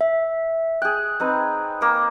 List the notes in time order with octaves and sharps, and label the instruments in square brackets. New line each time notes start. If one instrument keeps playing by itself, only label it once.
[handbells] E5
[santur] G#4 G5 [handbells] F#6
[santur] C4 D#4 B4
A#3 G5